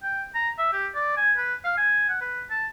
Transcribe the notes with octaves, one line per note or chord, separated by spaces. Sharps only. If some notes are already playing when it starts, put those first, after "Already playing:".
G5
A#5
E5
G4
D5
G#5
B4
F5
G#5
F#5
B4
A5